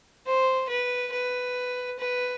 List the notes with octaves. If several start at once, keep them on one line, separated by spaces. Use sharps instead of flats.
C5
B4
B4
B4